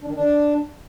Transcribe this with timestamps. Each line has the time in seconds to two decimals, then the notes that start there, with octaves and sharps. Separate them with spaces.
0.01 D4
0.08 D#3
0.15 D4